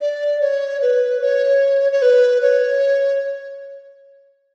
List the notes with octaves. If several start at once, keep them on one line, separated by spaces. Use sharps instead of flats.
D5
C#5
B4
C#5
C#5
B4
C#5